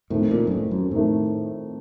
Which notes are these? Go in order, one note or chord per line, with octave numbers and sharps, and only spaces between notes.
F2 A2 D#3 A3
A#2
F#2
A2
F#2
F2 A2 D#3 A3